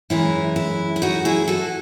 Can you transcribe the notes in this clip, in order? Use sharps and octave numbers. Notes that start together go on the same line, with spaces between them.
F#2 E3 G#3 E4
E4
E4
D#4 F#4
E4 G#4
F#4 A4